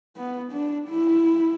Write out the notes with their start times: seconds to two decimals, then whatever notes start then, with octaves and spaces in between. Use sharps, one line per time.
0.16 B3
0.53 D4
0.89 E4